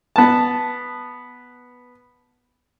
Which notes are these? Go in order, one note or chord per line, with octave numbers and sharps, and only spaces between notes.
B3 A5